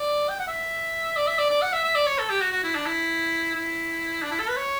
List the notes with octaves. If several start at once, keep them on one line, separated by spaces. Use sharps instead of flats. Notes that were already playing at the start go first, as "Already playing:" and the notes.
Already playing: D5
G5
F#5
E5
D5
E5
D5
D5
F#5
E5
E5
D5
C#5
A4
G4
F#4
F#4
E4
D4
E4
E4
D4
E4
A4
B4
C#5